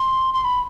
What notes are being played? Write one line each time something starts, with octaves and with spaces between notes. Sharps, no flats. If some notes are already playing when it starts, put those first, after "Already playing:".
Already playing: C6
C6
B5